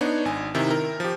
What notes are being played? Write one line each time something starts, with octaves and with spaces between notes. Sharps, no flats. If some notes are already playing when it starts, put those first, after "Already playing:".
B3 D4 D#4 C#5
G#1 G#5
C3 D#3 E4
A#4
F3 G4